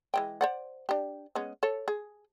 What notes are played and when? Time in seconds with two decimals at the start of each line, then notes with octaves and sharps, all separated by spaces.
0.14 E3 G#3 G5
0.41 C5 D5 F#5
0.89 D4 G4
1.35 G#3 B3 C#4
1.63 A4 C#5
1.88 G#4